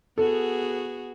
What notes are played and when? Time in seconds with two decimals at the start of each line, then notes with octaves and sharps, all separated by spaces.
0.18 B3 F#4 G#4 A4